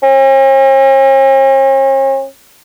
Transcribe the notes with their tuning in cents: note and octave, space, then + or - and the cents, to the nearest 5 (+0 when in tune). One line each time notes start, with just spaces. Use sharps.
C#4 -45